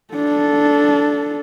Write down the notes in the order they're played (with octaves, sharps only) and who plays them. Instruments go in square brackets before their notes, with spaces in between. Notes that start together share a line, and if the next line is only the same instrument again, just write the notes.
[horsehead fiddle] D4 A4